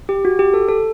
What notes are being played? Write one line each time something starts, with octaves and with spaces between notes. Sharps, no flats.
G4
F#4
G4
A4
A4